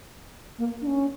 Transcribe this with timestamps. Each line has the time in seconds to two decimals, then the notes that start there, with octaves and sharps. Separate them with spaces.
0.58 A#3
0.81 D4
0.87 C#4